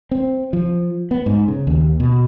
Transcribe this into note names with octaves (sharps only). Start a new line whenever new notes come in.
C4
F3
B3
G#2
C#3
D#2
B2